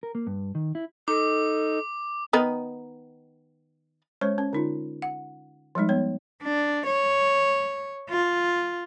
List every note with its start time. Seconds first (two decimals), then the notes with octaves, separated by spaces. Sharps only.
0.03 A#4
0.15 A#3
0.27 G2
0.55 D#3
0.75 E4
1.08 D#4 A4 D6
2.33 D#3 B3 D#4
4.21 G#3 C#4 C5 C#5 C#6
4.38 C#4
4.53 D3 D#4 F4
5.02 F#5
5.75 F3 G3 G#3 D#4
5.89 B3 C#5
6.43 D4
6.86 C#5
8.09 F4